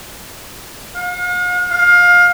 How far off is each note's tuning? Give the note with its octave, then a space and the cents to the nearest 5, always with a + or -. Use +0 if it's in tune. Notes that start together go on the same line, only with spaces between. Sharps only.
F5 +45
F5 +20